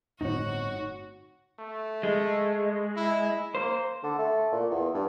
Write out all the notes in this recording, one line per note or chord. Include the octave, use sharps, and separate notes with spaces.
G1 A2 C4 D#4 F#4 C#5
A3
G#3
E4
A#3 C5
D3
A3
A#2
E2
G2